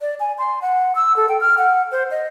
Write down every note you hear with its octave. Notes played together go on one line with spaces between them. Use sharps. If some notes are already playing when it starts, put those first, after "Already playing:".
D5
G#5
C6
F#5
E6
A4
G5
F6
F#5
C5
D#5